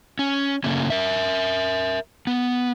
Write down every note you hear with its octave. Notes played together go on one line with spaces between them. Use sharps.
C#4
C#3 A3 A#3 C#4
A#4 E5
B3